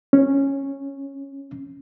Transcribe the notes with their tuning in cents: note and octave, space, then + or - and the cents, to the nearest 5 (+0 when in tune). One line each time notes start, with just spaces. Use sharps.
C#4 -10